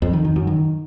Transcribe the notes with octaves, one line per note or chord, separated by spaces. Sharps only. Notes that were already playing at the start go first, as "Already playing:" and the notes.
F2
D#3
D#3
F#2
D#3